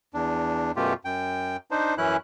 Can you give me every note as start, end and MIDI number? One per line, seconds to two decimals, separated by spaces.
0.14 0.71 40
0.14 0.71 62
0.76 0.94 42
0.76 0.94 47
0.76 0.94 57
0.76 0.94 65
0.76 0.94 67
1.05 1.57 42
1.05 1.57 79
1.71 1.94 62
1.71 1.94 63
1.71 1.94 72
1.98 2.17 42
1.98 2.17 52
1.98 2.17 61
1.98 2.17 64
1.98 2.17 90